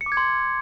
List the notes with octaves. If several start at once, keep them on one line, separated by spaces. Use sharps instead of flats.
C#7
D6
G#6
C6